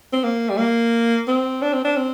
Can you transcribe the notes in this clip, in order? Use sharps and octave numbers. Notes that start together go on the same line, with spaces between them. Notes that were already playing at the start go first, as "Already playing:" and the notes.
C4
A#3
G3
A#3
C4
D4
C4
D4
C4